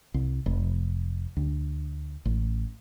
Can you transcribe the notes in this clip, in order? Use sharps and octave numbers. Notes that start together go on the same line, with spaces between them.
C2
F1
D2
A1